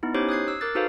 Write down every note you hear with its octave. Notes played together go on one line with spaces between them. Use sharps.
B3 D#4 E4
C#4 D#4 G4 C5 C#5 D6
D#6 F#6 G#6 C7
E6
A#4 D6 F#6 A6
D#4 F#4 A4 B4 C5 F5